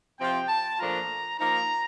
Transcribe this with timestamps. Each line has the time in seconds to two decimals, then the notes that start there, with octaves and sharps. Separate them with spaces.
0.19 C3 F3 C4 F4 G5
0.48 A5
0.79 A#2 F3 A3 D4 F4 A#5
1.39 F3 A#3 D#4 A#5